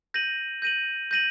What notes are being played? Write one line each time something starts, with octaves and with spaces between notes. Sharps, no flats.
G6 A#6 D#7 F#7
G6 A#6 D#7 F#7
G6 A#6 D#7 F#7